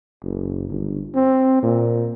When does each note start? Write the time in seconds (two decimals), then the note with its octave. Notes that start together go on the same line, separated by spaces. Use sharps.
0.23 F#1
0.69 G1
1.15 C4
1.63 A#2